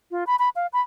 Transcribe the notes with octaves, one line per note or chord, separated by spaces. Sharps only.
F4
B5
B5
F5
B5